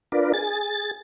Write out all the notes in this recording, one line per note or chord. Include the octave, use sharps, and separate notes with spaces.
D4 F4 A#4 B4 D5
G#4 A6